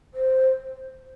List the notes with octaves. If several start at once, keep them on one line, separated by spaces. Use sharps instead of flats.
C5